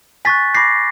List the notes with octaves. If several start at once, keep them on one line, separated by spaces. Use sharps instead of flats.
G#5 C#6 F#6 A6 B6
B5 D6 G6 A#6 C7